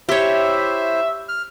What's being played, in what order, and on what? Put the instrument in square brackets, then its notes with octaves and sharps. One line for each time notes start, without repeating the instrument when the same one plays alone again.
[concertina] E4 C5 [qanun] G4 C#5 [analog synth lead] E5
[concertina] F6